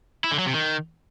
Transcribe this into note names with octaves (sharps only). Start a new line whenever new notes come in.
E4
D3
F#3
C3
D#3